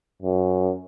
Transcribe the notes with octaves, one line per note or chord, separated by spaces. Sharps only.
F#2